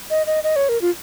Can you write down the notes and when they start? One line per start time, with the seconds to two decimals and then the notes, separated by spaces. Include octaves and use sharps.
0.10 D#5
0.27 D#5
0.44 D#5
0.56 C#5
0.69 A#4
0.82 F4